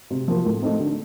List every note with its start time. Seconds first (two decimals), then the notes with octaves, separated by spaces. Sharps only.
0.10 C3
0.28 F3 A#3
0.45 A2
0.62 A3 C4 D#4
0.80 D3